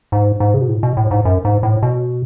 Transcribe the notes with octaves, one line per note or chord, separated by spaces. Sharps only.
G#2
G#2
C#3
B2
A2
B2
A2
G#2
F#2
G#2
A2
B2